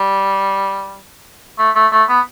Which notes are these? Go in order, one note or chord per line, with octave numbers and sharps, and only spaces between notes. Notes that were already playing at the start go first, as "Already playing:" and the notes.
Already playing: G3
A3
A3
A3
B3